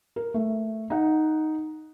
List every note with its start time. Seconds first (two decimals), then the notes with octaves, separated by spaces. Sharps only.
0.16 A#4
0.34 A3
0.90 D#4 F#5